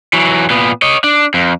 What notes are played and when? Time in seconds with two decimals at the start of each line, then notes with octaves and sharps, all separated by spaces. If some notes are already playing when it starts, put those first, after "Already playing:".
0.13 E3 F#3
0.50 A#2 B3
0.82 C#5 D#5
1.04 D4
1.34 F2